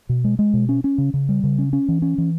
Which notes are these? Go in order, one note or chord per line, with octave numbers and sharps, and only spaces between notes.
B2
G#3
G#3
B2
C#4
C#4
C#3
C#3
G3
C#3
C#4
C#4
E3
C#4
E3